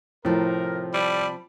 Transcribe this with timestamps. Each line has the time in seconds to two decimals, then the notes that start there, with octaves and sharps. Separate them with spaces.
0.25 A2 C3 F3 A#4
0.94 G3 A5 B5